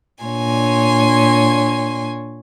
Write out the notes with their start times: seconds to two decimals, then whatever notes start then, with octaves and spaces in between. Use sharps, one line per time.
0.23 A#2 D4 C#5 G#5 C6